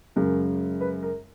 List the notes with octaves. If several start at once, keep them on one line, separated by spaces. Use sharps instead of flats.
F#2 C#3 G#3 A#4
B4
A#4